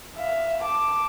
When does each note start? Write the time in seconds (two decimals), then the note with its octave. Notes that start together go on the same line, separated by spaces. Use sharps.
0.17 E5 F5
0.63 A5 D6